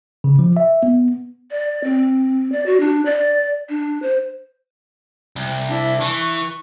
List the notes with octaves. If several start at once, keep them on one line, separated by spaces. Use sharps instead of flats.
C#3
F3
E5
B3
D5
C4
D5
F#4
D4
D5
D4
C5
C2
D4 E4
E3 C#6